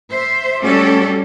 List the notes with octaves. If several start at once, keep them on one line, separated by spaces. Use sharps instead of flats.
C5 E5
G3 A3 C#4 F#4 G4 A4